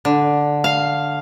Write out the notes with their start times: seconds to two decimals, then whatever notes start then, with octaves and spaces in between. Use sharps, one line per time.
0.05 D3
0.64 F5